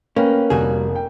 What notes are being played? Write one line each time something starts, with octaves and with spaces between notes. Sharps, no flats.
A#3 C#4 B4 G5
F1 G3 F#4 G#4
G5